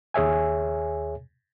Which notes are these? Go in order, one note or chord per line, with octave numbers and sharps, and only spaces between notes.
D#2 G#4 C#5 E5 G#5